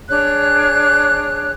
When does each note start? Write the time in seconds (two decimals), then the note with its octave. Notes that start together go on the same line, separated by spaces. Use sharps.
0.10 D4 G#4 C#5 F#6